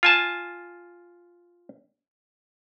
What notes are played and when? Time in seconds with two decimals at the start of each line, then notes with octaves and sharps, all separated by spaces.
0.03 F4 G#5 A5